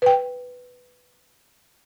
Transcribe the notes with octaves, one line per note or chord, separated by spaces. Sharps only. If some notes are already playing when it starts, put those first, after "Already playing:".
B4 G5